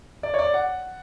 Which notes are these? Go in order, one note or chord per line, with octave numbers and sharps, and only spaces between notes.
D5
C#5
D5
F#5